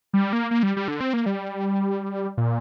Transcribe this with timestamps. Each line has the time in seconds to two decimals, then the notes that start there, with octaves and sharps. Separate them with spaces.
0.13 G3
0.33 A#3
0.51 A#3
0.63 G3
0.77 G3
0.88 D3
1.01 C4
1.13 A#3
1.26 G3
2.37 A#2